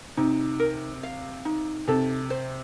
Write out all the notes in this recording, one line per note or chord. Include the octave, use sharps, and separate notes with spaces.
C3 D#4
A#4
F5
D#4
C3 A4
C5